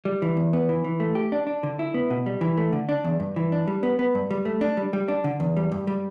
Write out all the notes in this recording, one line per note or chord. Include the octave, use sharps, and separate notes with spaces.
G3
E3
E2
B3
E3
E3
A3
G4
D4
D4
D3
E4
B3
B2
G3
E3
A3
D3
D4
E2
G2
E3
D4
G3
B3
B3
G2
G3
A3
D4
G3
G3
D4
D3
E2
G3
G2
G3